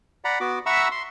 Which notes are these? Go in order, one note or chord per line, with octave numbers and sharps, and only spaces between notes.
D5 F#5 A#5 B5
B3 F#4 D6
E5 F#5 A#5 B5 C#6 E6
C6